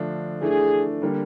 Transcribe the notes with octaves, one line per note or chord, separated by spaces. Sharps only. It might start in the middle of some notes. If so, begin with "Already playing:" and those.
Already playing: D3 F3 A3 D4
E3 A3 D4 G#4
D3 G3 A#3